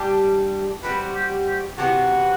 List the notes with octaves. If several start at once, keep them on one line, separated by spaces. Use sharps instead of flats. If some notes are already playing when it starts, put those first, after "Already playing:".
Already playing: G3 D4 G4
G3 C4 F#4 B4
G4
G4
C3 E3 B3 F#4